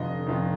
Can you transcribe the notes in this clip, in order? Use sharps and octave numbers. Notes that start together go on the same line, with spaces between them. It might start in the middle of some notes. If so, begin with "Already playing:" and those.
Already playing: F1 F2 D3 D#5
F1 F2 D3